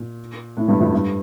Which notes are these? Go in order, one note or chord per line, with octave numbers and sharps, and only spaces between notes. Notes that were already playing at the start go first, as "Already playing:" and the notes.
Already playing: A#2
A2
G2
F2
G2